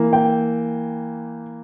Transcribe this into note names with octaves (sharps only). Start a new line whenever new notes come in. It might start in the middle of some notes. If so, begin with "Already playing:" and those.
Already playing: E3 A#3
G5